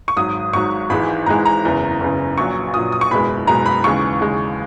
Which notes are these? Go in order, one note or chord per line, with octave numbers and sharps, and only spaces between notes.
C#6
G#1 G#2 F#3 D#6
G#1 G#2 F#3 C#6
G#1 G#2 E3 G#3 B5
G#1 G#2 E3 G#3 A#5
A#5
F#1 E2 C#3
F#1 E2 C#3
A#1 A#2 F#3 C#6
A#1 A#2 F#3 D#6
D#6
C#6
F#1 E2 B2 G#3 B5
F#1 E2 B2 G#3 A#5
B5
D#2 C#3 E3 G#3 C#6
D#2 C#3 E3 G#3